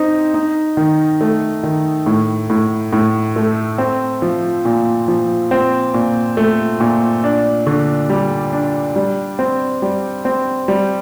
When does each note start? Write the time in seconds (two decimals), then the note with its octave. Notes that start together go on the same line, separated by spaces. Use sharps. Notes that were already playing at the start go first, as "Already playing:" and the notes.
Already playing: C4 D#4
0.34 D#4
0.77 D#3
1.21 A3
1.63 D#3
2.06 A2
2.50 A2
2.93 A2
3.36 A3
3.78 C4
4.22 F3
4.65 A#2
5.08 F3
5.51 C4
5.94 A#2
6.37 A3
6.80 A#2
7.24 D4
7.67 D3
8.10 G3
8.53 D4
8.96 G3
9.39 C4
9.82 G3
10.25 C4
10.68 G3